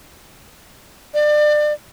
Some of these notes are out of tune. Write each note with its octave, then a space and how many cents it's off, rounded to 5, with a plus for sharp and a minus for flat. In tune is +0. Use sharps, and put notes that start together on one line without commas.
D5 +30